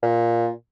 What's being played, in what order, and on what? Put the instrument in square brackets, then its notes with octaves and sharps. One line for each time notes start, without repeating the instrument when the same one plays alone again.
[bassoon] A#2